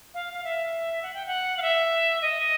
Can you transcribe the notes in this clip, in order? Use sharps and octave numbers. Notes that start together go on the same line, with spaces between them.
F5
F5
E5
F#5
G5
F#5
F5
E5
D#5